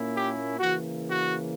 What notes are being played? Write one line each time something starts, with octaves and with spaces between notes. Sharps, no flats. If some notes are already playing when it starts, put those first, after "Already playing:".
Already playing: A#2 A#3 C#4 E4
G4
C#3 E3 A#3 F#4
F#4